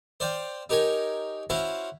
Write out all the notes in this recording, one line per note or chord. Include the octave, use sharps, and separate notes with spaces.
C5 D5 F5 G5
D#4 G4 A#4 C#5 G#5
C#4 E4 F#4 C5 F5